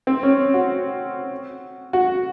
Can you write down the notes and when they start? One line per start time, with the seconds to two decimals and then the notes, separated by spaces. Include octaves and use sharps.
0.07 C4
0.23 C#4
0.54 F#4
1.93 F#4